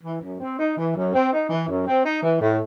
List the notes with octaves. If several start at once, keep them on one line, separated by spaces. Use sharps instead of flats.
E3
F#2
C4
D#4
E3
F#2
C4
D#4
E3
F#2
C4
D#4
E3
A2